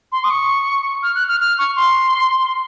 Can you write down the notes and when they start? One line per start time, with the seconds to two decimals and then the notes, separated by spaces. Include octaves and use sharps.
0.12 C6
0.24 D#6
0.30 C#6
1.03 F6
1.15 F#6
1.28 F6
1.40 F6
1.58 C#6
1.76 C6